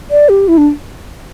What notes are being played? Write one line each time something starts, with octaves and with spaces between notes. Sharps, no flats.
D5
G4
E4
D4